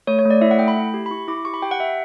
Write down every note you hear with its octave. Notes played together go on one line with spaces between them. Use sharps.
A3 C#5
C#5
A3
D5
E4 E5
F#5
A3 G5
B5
E4
G4
B5
E4 C#6
E4 D6
G4 C#6
B5
G4 G5
F#5
G4 E5